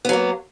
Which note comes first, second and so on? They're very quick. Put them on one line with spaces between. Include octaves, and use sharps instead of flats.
B3 F#3 A#3